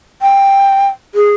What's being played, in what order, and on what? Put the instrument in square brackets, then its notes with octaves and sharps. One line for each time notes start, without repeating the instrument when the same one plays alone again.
[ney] G5
G#4